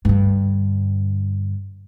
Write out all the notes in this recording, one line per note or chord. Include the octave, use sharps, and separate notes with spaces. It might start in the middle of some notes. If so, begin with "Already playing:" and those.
G2 D3